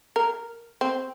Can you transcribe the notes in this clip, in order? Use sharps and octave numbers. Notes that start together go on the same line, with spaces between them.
A#4
C4